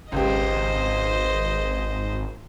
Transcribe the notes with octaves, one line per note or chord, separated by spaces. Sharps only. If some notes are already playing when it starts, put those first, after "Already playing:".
G#1 C#2 G4 C5 D#5